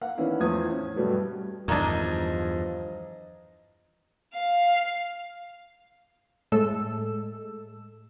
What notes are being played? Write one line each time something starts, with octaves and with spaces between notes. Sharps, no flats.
A#3 F5 F#5
D#3 E3 B3 C#4 D4 E4
E2 A2 F3 C5 D#6 G#6
C#4
G2 B2 F#3 G3 A3 B3
E2 G2 D#3 F3 D4 D#5 A#5 G#6
F5
A2 G#3 A3 A4 E6